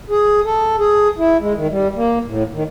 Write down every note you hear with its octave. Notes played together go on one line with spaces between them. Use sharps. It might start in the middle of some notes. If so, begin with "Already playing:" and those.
G#4
A4
G#4
E4
G#3
D#3
G3
A#3
A2
D#3